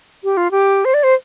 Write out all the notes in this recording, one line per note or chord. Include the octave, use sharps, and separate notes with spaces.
G4
F4
G4
C5
D5
C5